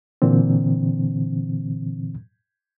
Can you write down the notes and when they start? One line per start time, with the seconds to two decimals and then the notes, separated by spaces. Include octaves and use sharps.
0.22 A#2 D3 E3 C4